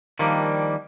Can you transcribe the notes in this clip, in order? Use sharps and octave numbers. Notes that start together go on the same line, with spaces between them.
D#3 F3 G3 A#3 D4